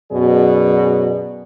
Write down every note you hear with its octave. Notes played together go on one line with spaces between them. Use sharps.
F#2 B2 F#3 G#4 D5